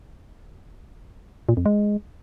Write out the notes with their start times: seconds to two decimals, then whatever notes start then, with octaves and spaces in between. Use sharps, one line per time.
1.49 A#2
1.57 F2
1.66 G#3